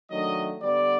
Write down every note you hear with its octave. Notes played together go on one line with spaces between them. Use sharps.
D#3 F#3 A3 D4 D#5
D3 G3 B3 D5